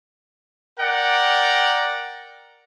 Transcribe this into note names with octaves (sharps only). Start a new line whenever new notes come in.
A#4 D5 F#5 G5 A#5